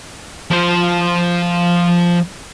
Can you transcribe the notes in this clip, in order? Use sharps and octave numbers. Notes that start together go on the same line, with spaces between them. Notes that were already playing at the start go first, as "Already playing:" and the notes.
F3 C5